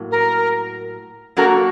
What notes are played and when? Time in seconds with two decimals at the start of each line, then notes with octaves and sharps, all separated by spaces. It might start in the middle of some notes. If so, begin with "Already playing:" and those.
Already playing: A2 F#3 A#3
0.11 A#4
1.37 F#3 A#3 D4 F#4 A4 A#4